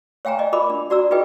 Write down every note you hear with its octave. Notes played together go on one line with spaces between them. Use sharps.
C#5 F5 G5 G#5 A#5
D5 D#5
F4 A#4 D#5 B5 D6
D4
F#4 D5 A#5 E6
D#4 F4 G#4 B4 D#5 G5